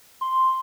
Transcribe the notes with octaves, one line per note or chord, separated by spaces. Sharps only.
C6